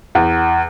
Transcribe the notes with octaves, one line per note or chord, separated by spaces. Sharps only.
E2